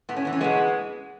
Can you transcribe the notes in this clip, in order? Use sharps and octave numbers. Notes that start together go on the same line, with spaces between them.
A2 B3
C#4
E3 B3
C#4
B2 G#3 B3